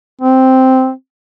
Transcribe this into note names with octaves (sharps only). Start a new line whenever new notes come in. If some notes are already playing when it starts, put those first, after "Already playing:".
C4